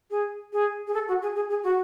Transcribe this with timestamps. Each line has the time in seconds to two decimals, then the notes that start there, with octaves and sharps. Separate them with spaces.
0.10 G#4
0.52 G#4
0.87 G#4
0.94 A4
1.07 F#4
1.22 G#4
1.35 G#4
1.49 G#4
1.63 F#4